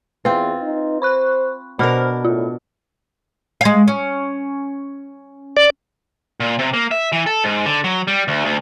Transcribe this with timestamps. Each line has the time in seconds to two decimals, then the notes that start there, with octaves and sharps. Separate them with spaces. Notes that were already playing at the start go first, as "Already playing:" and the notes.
0.25 E2 C4 F4 B4
0.62 D#4
1.02 C5 B5 C#6 F#6
1.79 B2 D4 A#4 C5 B5 F6
2.25 A2 F4
3.61 G#3 F5
3.88 C#4
5.57 D5
6.40 A#2
6.59 C3
6.74 A#3
6.91 E5
7.12 E3
7.26 A4
7.44 G#2
7.66 D3
7.84 F#3
8.08 G3
8.28 D2
8.45 D2